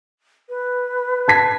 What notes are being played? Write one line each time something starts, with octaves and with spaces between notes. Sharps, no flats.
B4
A5 G#6 B6